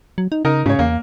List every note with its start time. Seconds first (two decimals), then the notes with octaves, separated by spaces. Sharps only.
0.18 F#3
0.32 D#4
0.45 C#3 D#4 A#4
0.66 G#2 C#3 C#5
0.79 E2 A#3